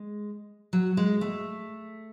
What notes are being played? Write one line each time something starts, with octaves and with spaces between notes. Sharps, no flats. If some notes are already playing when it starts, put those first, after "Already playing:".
Already playing: G#3
F#3
G#3
A3